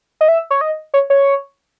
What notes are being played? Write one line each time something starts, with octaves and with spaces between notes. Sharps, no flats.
D#5
E5
C#5
D#5
C#5
C#5